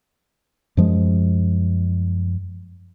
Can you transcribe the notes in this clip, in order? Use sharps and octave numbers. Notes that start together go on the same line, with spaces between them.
F#2 F3 G#3